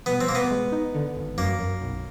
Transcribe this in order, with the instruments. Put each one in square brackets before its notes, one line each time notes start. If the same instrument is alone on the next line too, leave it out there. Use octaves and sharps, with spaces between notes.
[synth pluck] B2 [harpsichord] B3
[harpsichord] C4
[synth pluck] B2 [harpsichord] A#3
[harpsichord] B3
[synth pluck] G#3
D#4
D3
G#1
[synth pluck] F#2 [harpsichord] A#3
[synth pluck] F#2
B1